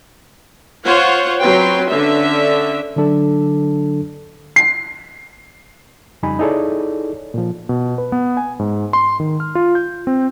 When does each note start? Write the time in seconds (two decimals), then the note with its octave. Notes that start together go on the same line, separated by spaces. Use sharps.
0.85 F4 C5 C#5 F#5
1.42 F#3 C4 B4 G5 C6
1.90 D3 C#4 E5
2.96 D3 F#3 D4 A4
4.56 C7
6.23 F2 C#3 G3 D#4 G#5 B5
6.39 D#4 E4 G#4 A4 C#5 D5
7.34 A#2 F3
7.69 B2
7.98 B4
8.12 B3
8.37 G#5
8.59 G#2
8.93 C6
9.20 D#3
9.40 F6
9.55 F4
9.75 G6
10.07 C4